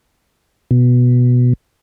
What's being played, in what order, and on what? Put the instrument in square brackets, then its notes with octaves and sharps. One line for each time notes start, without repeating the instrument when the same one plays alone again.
[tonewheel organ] B2